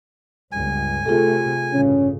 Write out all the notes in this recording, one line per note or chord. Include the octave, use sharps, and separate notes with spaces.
G1 C#2 G#5
C3 A3 F4 G#4 A4
A1 G2 C#3 C#4